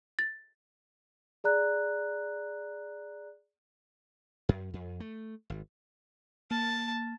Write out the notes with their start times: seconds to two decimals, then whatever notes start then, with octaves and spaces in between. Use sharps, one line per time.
0.19 A6
1.44 G#4 D5 A#5 F#6
4.49 F#2
4.74 F2
5.00 A3
5.50 G#1
6.51 A#3 A5